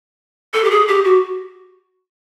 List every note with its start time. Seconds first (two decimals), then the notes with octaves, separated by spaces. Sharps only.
0.54 A4
0.64 G4
0.71 G#4
0.88 G4
1.05 F#4